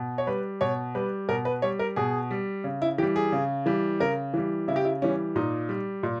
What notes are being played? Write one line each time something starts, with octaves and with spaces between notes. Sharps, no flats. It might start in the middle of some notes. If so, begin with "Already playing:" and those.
Already playing: B2
C#5
G3 B4
B2 C#5
G3 B4
B2 A#4
B4
G3 C#5
A#4
B2 G#4
G3
C#3
E4
E3 G3 G4
G#4
C#3
E3 G3
C#3 A#4
E3 G3
C#3 E4
G4
E4
E3 G3 C#4
A#2 D#4
G3
A#2